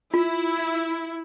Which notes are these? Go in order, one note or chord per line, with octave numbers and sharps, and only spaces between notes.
E4 F4